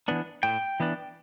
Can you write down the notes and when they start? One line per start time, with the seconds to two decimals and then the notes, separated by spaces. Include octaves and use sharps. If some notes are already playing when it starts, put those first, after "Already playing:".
0.08 E3 B3 D4
0.43 A2 G5
0.80 E3 B3 D4